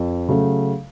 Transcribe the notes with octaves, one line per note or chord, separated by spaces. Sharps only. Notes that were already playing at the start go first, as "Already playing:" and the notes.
Already playing: F2
C#3 F#3 A3